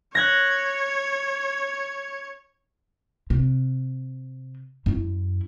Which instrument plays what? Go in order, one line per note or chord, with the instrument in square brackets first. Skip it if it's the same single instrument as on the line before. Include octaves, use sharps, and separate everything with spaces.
[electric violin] C#5 [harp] F#6 G#6 A#6
[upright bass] C3
F#2 E4